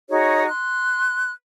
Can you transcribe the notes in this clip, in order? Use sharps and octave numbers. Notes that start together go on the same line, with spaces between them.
D#4 F#4 G#4 C#5
C6 F#6